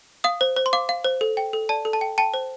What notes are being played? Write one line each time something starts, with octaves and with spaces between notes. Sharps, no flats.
F5 D#6
C5
C5
C6
F5 D6
F5
C5
A4
G5
A4
D5 A5
A4
A5
G5
G5 A5
C5